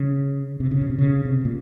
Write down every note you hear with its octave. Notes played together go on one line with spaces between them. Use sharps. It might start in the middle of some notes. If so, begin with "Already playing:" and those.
Already playing: C#3
C3
C#3
B2
C3
C#3
C3
A#2